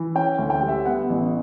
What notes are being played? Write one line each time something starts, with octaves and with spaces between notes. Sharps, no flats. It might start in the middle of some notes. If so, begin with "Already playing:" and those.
Already playing: E3
C#4 G5
D2
G5
G3
E5
B3 F#5
A1